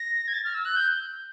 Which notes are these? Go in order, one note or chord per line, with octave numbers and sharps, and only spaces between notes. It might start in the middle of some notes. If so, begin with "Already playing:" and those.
Already playing: A#6
G#6
A6
F6
E6
F#6
G6